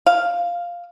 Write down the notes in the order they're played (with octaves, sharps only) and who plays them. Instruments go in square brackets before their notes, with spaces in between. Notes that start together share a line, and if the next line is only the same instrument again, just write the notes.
[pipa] F5